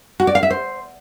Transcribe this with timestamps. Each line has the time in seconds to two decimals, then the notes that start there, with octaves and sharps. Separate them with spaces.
0.20 F#4
0.27 D5
0.35 F5
0.43 E5
0.50 C5